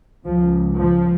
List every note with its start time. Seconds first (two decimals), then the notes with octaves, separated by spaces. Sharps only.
0.23 C#2 C#3 F3
0.78 F3